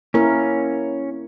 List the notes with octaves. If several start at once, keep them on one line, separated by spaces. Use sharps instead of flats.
A#3 C#4 E4 A#4